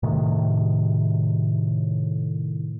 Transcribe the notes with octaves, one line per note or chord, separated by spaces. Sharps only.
A2 C3 D#3